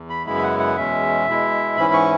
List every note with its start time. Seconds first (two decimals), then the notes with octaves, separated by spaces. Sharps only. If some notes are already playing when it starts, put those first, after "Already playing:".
Already playing: E2
0.10 B5
0.26 F#2 C#3 G#3 B3 E4 B5
0.36 E5
0.43 F#5
0.59 F#5
0.76 E2 B2 G#3 C#4 E5
1.26 B2 G#3 E4
1.76 G#2 E3 C#4 E4 B5
1.93 C#6